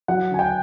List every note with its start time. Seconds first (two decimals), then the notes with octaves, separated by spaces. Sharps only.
0.08 F#3 F#5
0.31 D3 G#5
0.39 G5